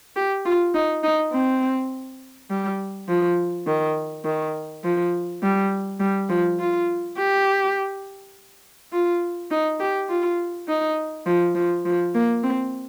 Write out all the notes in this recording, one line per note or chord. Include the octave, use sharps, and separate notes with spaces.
G4
F4
D#4
D#4
C4
G3
F3
D#3
D#3
F3
G3
G3
F3
F4
G4
F4
D#4
G4
F4
D#4
F3
F3
F3
A#3
C4